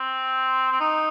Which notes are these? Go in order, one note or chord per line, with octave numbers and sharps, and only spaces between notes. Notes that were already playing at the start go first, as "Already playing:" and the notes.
Already playing: C4
C4
D#4